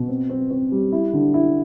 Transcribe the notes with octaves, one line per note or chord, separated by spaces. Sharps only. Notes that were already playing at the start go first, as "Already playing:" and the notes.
Already playing: B2
C4
C4
C4
G3
E4
D3
E4